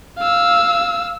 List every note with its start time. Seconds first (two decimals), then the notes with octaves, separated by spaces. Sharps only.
0.19 F5 E6